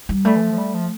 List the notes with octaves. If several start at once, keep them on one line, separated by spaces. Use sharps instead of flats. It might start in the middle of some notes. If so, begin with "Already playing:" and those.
G3
G3 A3
E3
F3
F3
G3
F3